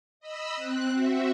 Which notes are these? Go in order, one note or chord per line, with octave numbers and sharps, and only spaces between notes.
D#5 B5 E6
C4 F#6
C4 F#4 E5